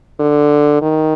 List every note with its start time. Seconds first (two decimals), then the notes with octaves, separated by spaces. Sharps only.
0.20 D3
0.82 D#3